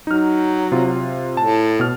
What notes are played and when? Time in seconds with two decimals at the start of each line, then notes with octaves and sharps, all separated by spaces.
0.07 F#3 D#4 F6
0.72 C3 F4
1.37 A2 A5
1.80 B2 F6